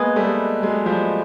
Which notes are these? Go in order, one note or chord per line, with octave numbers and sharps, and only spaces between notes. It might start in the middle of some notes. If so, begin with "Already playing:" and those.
Already playing: G#3 A#3 B3 B4 D#5 G#5
G3 A3
F#3 G#3
F3 G3